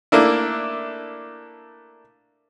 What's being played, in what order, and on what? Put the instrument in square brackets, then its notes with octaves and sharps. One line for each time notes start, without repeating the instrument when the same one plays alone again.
[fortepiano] A3 A#3 D4 E4